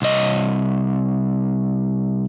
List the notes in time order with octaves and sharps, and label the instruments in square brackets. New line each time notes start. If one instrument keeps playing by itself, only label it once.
[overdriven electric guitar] C2 D#5